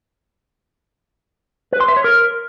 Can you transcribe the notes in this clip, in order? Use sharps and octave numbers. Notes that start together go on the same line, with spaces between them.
B4
C6
E5
C#5
A#4